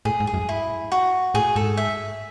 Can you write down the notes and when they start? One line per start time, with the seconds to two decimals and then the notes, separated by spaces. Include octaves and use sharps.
0.05 A2 G#4
0.20 G#2
0.27 G#4
0.34 F#2
0.49 E4
0.92 F#4
1.34 A2 G#4
1.56 G#2 A4
1.77 E5